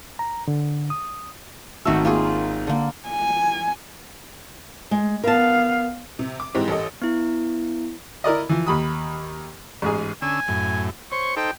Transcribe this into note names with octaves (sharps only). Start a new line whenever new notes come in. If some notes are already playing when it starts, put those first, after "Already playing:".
A#5
D3
D#6
G#1 D#3 A3 F#4 E6
A#3 F4 G#4
D3 A#3
G#5
G#3
B3 A#4 F5 A5
C3
D6
G#2 E3 G#3 C4 G4
A1 G4 A4 D#5
B3 E4
E4 A#4 D5 D#5
E3 F3
D#2 B5 D#6
A1 G#2 G#4
D3 C#4 G#5 E6
F#2 A2
C5 C#5 C#6
D#4 A4 C5 G5